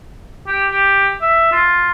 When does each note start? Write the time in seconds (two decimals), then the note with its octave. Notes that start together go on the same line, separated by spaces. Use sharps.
0.47 G4
0.71 G4
1.22 E5
1.52 F4